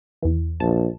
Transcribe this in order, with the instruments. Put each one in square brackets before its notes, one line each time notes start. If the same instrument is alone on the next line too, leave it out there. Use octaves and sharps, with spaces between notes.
[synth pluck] E2 E3
[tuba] A#1 [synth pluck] A5